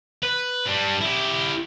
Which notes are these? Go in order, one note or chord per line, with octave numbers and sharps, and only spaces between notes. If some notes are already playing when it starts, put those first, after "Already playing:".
B4
G3 D4
E4 G4